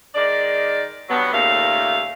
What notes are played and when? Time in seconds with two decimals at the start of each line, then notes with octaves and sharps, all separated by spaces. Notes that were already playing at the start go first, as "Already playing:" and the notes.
0.15 D#3 G#3 D5
1.09 G2 F#3 B3
1.33 D#2 A#2 C#3 A3 F5